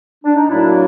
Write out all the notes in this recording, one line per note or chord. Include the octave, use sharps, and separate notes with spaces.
D4
D#4
A2 F#3 A#3 D4 E4